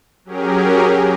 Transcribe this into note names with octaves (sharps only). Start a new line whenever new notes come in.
F#3 C#4 G4 G#4 A#4